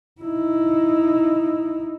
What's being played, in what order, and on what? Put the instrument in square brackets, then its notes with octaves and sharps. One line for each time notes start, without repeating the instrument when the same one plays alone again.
[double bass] D#4 E4